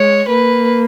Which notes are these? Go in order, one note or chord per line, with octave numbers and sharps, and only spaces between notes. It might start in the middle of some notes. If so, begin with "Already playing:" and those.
Already playing: G#3 C#5
A#3 B4